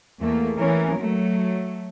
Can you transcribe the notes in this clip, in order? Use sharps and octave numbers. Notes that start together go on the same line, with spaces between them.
E2 A3 A#3
E3 C#4 A#4
F#3 A3